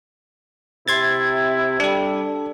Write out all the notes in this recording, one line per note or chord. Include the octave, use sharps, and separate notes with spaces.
C3 E4 C6 G#6 A6
G3 D4 A4